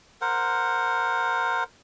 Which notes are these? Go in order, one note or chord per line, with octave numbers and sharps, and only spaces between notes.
A#4 C5 F#5